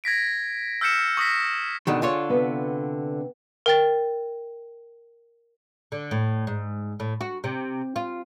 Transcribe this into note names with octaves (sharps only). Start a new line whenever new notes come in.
G#6 A#6 B6 D7
E6 F6 G6 B6 C#7 E7
C#6 D#6 A#6 B6
B2 D3 D#3 G#4
D3 F4 C#5
C3 B3 B4
A#4 G5 A6
D3
A2
G#2
A2
F#4
C3
F4